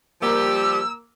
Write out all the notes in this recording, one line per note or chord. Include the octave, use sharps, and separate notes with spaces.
F3 G3 A#3 G4 A#4 E6